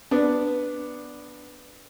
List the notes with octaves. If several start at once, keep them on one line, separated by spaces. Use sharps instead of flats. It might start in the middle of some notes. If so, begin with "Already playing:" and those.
B3 D4